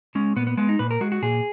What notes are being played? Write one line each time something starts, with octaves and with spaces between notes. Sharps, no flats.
G#3 C#4
A#2 B3
B3
G#3 B3
D#4
A#2 B4
A#4
G#3 F#4
F#4
A#2 G#4